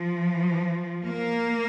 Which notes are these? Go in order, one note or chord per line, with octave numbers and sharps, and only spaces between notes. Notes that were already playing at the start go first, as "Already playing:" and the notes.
Already playing: F3
A#3